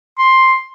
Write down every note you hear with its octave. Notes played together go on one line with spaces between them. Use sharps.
C6